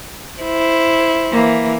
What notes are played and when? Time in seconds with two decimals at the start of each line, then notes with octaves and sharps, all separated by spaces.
0.42 E4 C5
1.31 E3 A#3